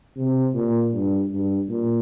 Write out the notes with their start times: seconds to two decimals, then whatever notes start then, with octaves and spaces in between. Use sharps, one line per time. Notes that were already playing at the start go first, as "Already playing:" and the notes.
0.17 C3
0.54 A#2
0.93 G2
1.31 G2
1.69 A#2